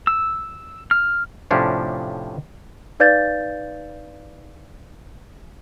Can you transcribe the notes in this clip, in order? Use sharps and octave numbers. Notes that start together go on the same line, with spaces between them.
E6
F6
A2 C3 F3 C#4 D4
D#4 B4 D5 F5 G6 A6